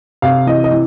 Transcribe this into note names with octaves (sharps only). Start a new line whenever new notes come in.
C3 F5
E3 D#5
D#5
E3